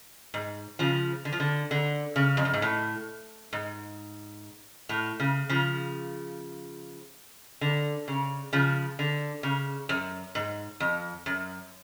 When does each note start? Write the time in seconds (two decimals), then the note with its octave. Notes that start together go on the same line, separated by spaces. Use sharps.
0.34 G#2
0.79 C#3 F3
1.25 D3
1.32 F3
1.40 D3
1.71 D3
2.16 C#3
2.37 F2
2.45 F#2
2.53 G#2
2.62 A2
3.53 G#2
4.89 A2
5.20 C#3
5.49 C#3 F3
7.61 D3
8.08 C#3
8.53 C#3 F3
8.99 D3
9.43 C#3
9.89 F#2
10.35 G#2
10.80 F2
11.26 F#2